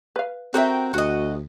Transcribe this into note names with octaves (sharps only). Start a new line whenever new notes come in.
B4 F5
C4 F#4 A4 A#4 E5 G5
D2 F#4 D#5